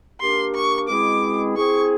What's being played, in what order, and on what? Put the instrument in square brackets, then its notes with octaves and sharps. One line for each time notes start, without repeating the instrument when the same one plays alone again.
[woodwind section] A#3 D4 G4 A#4 [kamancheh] C6
[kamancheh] C#6
[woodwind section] B2 G#3 C4 E4 G#4 [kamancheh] D6
[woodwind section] C4 E4 G#4 [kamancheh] C#6